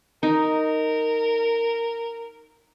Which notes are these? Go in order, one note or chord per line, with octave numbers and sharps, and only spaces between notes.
D#4 A#4